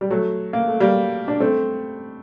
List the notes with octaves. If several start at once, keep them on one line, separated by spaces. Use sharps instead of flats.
G3
F#3 A3
A#3
A3
G3 A#3
D4
A3 C4